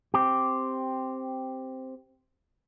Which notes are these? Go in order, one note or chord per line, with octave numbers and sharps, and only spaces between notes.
C4 G4